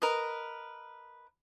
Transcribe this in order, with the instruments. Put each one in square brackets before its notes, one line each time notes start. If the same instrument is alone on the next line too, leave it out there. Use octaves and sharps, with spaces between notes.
[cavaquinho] A#4 B4 D#5